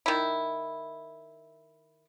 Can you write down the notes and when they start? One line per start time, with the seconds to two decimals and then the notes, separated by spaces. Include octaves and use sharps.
0.06 D#3 E4